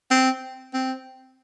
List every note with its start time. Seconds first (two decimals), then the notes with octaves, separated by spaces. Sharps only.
0.11 C4
0.74 C4